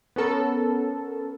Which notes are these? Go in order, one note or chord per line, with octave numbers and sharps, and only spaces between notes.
B3 C#4 A4 A#4